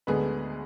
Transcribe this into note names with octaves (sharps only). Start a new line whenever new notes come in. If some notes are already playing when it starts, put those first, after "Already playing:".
D2 D3 G#3 B3 G#4 B4